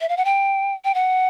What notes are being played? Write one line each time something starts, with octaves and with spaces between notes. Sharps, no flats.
E5
F5
F#5
G5
G5
F#5